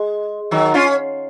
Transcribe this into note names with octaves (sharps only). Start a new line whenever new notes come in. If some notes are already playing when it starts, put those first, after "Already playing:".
Already playing: G#3
D#3 F#3
C#4 F4